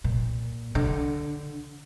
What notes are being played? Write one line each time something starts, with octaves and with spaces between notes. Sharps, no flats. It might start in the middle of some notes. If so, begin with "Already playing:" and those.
A#2
D3